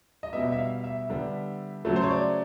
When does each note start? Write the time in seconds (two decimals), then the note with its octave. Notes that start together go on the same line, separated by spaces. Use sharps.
0.23 D#5
0.33 B2 G3 B3 E5
0.52 E5
0.58 F5
0.84 E5
1.10 D3 G3 B3
1.85 C#3 F#3 A3
1.96 C5
2.03 C#5
2.11 D5